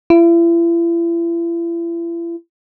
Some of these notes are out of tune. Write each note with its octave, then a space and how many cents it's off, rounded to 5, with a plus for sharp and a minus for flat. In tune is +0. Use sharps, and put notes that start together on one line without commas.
E4 +40